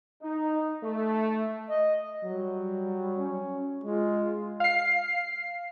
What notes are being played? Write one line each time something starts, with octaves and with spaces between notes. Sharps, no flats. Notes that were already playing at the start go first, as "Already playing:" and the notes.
D#4
A3
D#5
F#3 G3
C#4
G#3 F4
F5 C7